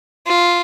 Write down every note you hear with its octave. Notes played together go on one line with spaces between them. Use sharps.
F4